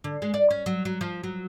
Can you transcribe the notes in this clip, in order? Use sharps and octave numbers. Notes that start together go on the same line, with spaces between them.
D3
G#3
D5
C#4
F#3
F#3
F3
F#3